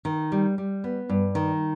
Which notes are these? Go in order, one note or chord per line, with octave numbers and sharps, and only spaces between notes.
D#3
G3
G3
B3
G2
D#3